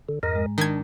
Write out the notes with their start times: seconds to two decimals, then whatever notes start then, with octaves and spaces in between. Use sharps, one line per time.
0.09 D3
0.23 F2 G#2 A#4 D#5 A#5 A#6
0.35 G#3
0.58 D#3 D4 G#6